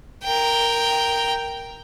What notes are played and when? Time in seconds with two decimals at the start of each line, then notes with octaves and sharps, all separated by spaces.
0.24 A#4 G5